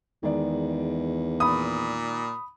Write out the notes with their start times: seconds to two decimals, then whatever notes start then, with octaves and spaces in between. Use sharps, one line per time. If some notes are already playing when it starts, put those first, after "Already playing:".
0.23 E2 D#3 G#3 D5
1.40 A#2 B5 D#6